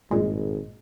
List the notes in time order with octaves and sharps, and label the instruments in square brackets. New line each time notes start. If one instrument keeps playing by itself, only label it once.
[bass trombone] G#1 [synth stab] G2 A#2 G#3